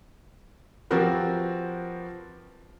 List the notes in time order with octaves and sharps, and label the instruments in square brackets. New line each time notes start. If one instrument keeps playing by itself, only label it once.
[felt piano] F3 C4 F#4 G4 A#4 B4